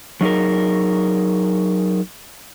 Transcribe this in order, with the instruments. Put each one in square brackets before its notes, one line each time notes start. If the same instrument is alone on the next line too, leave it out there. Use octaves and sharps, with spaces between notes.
[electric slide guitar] F#3 D#4 G#4 A#4